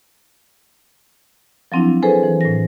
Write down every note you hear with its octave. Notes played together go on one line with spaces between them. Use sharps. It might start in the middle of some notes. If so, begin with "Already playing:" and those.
F3 F#3 C4 D4 E4
G#4 A4 B4 C5 G#5
E3
A2 A#6